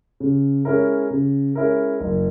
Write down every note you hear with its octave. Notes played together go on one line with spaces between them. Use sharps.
C#3
G#3 C#4 E4 A#4
C#3
G#3 C#4 E4 A#4
F#1